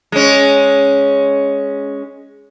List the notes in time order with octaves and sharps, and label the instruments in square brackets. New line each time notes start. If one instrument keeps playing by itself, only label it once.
[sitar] G#3 C#4